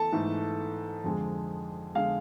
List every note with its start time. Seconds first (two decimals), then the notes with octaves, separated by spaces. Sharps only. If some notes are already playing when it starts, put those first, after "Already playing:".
Already playing: E3 A3 A4 A5
0.12 G#2 E3 A3
1.04 F2 D3 G#3
1.95 D3 G#3 F5